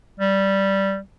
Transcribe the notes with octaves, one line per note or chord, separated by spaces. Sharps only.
G3